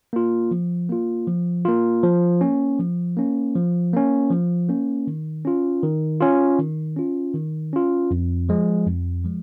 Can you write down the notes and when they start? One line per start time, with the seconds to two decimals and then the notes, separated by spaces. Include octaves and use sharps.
0.13 A#3 F4
0.51 F3
0.89 A#3 F4
1.27 F3
1.65 A#3 F4
2.03 F3
2.41 A#3 C#4
2.79 F3
3.17 A#3 C#4
3.56 F3
3.93 A#3 C#4
4.31 F3
4.69 A#3 C#4
5.07 D#3
5.45 C#4 F4
5.83 D#3
6.20 C#4 F4
6.59 D#3
6.96 C#4 F4
7.34 D#3
7.73 C#4 F4
8.11 F2
8.49 F3 G#3
8.86 F2
9.24 F3 G#3